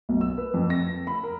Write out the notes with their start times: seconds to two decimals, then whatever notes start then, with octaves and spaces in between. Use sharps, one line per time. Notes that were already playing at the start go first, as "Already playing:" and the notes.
0.09 B1
0.21 E6
0.38 B4
0.54 F2
0.70 A#6
1.07 B5
1.23 A#4